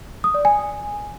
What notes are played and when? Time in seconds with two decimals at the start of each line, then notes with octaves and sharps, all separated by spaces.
0.24 D#6
0.34 D5
0.45 G#5